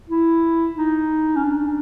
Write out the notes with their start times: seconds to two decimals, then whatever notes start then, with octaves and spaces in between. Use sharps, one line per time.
0.09 E4
0.77 D#4
1.36 C#4
1.44 D4